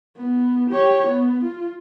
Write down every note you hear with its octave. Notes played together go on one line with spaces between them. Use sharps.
B3
G4 C#5
B3
F4